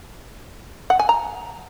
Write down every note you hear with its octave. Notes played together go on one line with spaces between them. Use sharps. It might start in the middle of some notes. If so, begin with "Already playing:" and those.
F#5
G#5
A#5